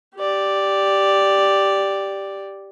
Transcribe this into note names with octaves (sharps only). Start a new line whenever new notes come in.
G4 D5